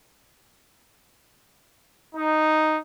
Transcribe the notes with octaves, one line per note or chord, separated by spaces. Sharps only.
D#4